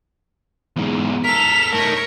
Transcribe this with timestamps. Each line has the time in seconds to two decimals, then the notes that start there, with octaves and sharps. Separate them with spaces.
0.76 E2 G#2
1.24 A4 A#4 B6 F7
1.73 A3 D#4 A#4 C#5